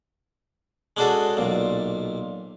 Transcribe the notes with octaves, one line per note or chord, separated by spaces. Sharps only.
G#3 C#4 D4 F#4 G#4 A4
B1 A#2